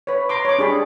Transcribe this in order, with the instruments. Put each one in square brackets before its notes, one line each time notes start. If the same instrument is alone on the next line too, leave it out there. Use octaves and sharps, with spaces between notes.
[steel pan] B4 C#5
A#5 C6 D6
C#5 D6
D4 G4 G#4 B5